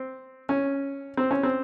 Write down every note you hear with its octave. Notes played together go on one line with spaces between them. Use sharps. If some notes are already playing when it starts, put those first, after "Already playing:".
Already playing: C4
C#4
C4
C#4
C4